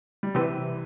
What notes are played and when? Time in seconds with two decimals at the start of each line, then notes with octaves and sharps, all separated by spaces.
0.23 G3
0.35 C3 E3 G3 C4 G4